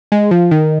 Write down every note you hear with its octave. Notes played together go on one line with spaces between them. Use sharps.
G#3
F3
D#3